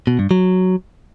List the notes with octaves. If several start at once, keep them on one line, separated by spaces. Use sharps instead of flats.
B2
G2
F#3